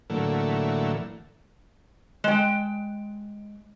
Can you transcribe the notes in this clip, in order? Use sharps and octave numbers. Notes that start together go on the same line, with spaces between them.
A2 D3 E3 F#3 A3 A#3
G#3 G5